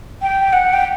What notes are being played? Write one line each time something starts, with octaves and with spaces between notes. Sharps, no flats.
G5
F#5
G5